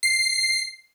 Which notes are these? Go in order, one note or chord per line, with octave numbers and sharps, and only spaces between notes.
C7